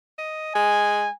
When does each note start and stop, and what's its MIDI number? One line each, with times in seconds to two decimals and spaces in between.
0.18 0.54 75
0.55 1.06 56
0.55 1.12 80